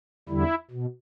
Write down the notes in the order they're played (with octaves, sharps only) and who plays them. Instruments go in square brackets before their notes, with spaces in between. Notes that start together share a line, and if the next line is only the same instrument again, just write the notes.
[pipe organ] E2 D3 G3 E4
B2